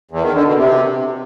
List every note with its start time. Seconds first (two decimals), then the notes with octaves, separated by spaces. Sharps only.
0.11 E2
0.23 D#3
0.34 D3
0.46 B2
0.58 C3